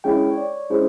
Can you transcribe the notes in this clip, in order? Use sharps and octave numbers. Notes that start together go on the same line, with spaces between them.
G#3 C#4 E4 G5
C#5
D5
G#3 C#4 E4 C5